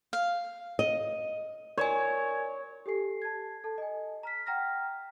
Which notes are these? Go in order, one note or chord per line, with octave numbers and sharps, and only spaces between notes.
F5
D#5
A#4 C#5 D5 G#5
G4 A4 G#5 C7
A5 G#6
A4 A5
D#5 G#5
A#5 F6 B6
F#5 G5 A#5 F6 A#6